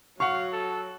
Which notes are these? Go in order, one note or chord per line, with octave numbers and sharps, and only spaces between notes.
F#3 F5 F#5 C#6
A4